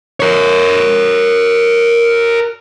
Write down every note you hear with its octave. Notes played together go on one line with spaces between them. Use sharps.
A#4 C#5